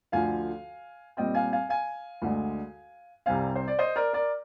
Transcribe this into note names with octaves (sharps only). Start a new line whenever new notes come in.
D2 D3 F3 F5 G#5
A#2 G3 C4 D#5 G5
F5 G#5
F5 G#5
F5 G#5
D2 D3 G#3
C2 C3 G3 C4 F5 G#5
C5
D5
C5 D#5
A#4 D5
A#4 D5